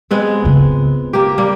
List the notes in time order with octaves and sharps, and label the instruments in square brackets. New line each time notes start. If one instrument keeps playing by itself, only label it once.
[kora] G#3 B3 C4
[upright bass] C#3 F4
[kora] A#3 G4
G3 A#3